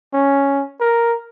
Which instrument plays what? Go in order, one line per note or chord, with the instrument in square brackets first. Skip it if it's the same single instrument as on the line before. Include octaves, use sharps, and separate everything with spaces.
[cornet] C#4
A#4